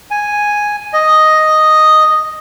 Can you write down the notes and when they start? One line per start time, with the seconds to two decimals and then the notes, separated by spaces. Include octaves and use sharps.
0.11 G#5
0.93 D#5